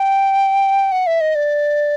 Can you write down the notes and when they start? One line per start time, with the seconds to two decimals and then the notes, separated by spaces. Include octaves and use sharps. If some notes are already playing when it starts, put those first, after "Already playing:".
Already playing: G5
0.92 F#5
1.07 E5
1.21 D#5
1.35 D5